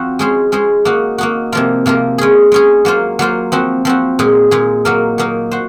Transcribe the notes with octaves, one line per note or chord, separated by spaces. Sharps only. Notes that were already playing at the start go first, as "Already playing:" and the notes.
Already playing: F3 C4 F#4
G#3 C#4 G#4 C5
G#3 C#4 G#4 C5
A#3 D#4 F#4
A#3 D#4 F#4
C3 F3 A#3 F4 A#4
C3 F3 A#3 F4 A#4
G#3 C#4 G#4
G#3 C#4 G#4
F#3 A#3 F4 C5
F#3 A#3 F4 C5
F3 C4 F#4
F3 C4 F#4
A#2 G#3 D#4 G#4
A#2 G#3 D#4 G#4
F#3 A#3 D#4 A#4
F#3 A#3 D#4 A#4
F#4 C5